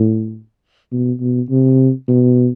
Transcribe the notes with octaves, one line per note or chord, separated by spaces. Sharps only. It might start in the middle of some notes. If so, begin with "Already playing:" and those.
Already playing: A2
B2
B2
C3
B2